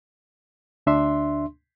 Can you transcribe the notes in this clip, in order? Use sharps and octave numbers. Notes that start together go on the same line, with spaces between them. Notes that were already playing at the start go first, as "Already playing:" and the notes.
D2 D4 E5 C6